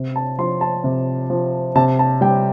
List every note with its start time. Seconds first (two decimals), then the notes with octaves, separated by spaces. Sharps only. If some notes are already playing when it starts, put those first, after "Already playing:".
Already playing: C3
0.16 A5
0.38 F3 C6
0.61 A5
0.84 C3
1.30 F3
1.75 C3 A5
1.99 A5
2.21 G3 G5